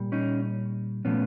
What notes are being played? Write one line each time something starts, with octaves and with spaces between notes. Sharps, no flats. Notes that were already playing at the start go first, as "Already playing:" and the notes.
Already playing: A#2 G3
C#4 D#4
A#2 F3 A3 B3 C#4